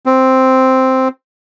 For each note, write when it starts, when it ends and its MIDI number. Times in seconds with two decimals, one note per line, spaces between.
0.06 1.08 60